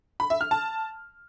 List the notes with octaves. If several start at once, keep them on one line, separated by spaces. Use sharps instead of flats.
B5
E5
F6
A5